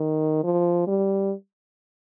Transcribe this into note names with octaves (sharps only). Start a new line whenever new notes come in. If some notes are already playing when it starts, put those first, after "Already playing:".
Already playing: D#3
F3
G3